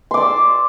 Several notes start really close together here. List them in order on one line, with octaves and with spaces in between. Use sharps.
C6 D6 D5 E6